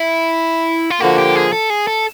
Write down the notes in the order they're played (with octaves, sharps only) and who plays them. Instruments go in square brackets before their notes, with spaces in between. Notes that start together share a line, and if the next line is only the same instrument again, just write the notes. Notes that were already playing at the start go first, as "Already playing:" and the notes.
Already playing: [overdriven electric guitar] E4
F4
[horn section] D3 F3 A#3 [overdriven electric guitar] F#4
[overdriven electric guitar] G4
G#4
A4
G#4
A4